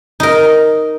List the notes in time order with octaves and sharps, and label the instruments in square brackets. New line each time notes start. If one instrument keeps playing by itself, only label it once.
[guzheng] D#4 A#4